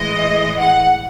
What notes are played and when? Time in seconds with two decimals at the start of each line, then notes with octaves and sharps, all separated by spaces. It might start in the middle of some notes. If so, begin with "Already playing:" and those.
Already playing: A2 E3 G#3 D#5
0.60 F#5